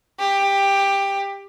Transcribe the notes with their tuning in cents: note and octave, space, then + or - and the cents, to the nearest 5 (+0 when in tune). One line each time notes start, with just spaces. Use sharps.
G4 +15